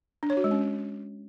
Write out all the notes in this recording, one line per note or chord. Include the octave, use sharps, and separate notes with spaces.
D4
C#5
F#4
G#3
C#4